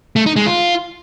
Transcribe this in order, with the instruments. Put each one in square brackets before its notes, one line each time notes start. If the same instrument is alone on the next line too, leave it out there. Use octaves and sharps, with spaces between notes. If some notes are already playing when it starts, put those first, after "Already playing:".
[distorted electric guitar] A3
D#4
G#3
F4